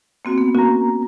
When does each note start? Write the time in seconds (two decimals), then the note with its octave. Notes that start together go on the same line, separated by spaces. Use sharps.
0.25 A#3 C4 F#4
0.38 B3
0.55 A#3 C#4 F#4 A#5